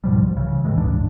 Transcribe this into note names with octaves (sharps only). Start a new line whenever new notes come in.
G#2 B2 F3 G3
C2
C#3 E3
A2 C3 E3 G#3
A1 D2 G2 D4